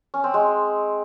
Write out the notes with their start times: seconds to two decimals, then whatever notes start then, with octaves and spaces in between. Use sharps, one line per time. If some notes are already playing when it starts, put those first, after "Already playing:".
0.14 C#4
0.24 C4
0.34 G#3